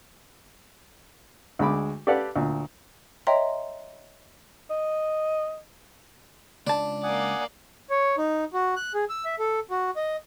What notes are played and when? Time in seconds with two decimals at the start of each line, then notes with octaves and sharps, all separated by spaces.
1.59 D2 G#3 B5 D6
2.07 G4 A4 B4 D5 F5 F#5
2.36 D2 A#2
3.27 C#5 D#5 E5 G5 A#5 C6
4.70 D#5
6.67 C#2 D4 A5
7.03 A#3 D5 F#5 G#5 D#6
7.90 C#5
8.18 D#4
8.53 F#4
8.76 F#6
8.94 G#4
9.09 E6
9.25 E5
9.39 A4
9.70 F#4
9.96 D#5